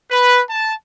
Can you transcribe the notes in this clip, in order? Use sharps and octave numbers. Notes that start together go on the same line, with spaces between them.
B4
A5